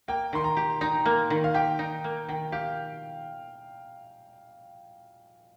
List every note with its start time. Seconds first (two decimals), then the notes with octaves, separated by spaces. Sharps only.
0.08 A#3 G5
0.33 D#3 C6
0.44 A#5
0.57 G4
0.81 D#4 A#5
1.05 A#3
1.30 D#3
1.44 F5
1.54 G4 G5
1.79 D#4
2.04 A#3
2.28 D#3 G5
2.52 G4 F5